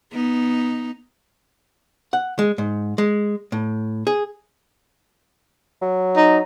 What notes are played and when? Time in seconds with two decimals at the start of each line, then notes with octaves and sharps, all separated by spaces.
0.12 B3 D#4
2.13 F#5
2.39 G#3
2.58 G#2
2.98 G#3
3.52 A2
4.07 G#4
5.82 F#3
6.17 D#4